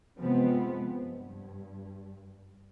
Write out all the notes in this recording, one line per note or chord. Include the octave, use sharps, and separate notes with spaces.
C3 F3 G#3 B3 C4
G2